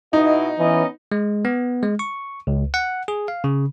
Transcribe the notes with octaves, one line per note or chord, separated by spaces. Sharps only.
B2 D#4 E4 D#5
E3 B3 C#4 D#5
G#3
B3
G#3
C#6
C#2
F#5
G#4
F5
C#3